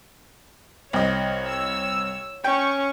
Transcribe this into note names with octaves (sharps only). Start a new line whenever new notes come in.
C2 C#5 D#5
E6
C#4 G5 C#6